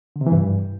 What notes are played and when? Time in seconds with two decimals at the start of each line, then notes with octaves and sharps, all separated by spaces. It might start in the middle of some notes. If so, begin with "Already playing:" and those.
0.16 D3
0.21 C3
0.26 E3
0.32 G2